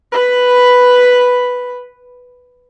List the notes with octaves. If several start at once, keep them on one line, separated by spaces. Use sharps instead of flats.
B4 B5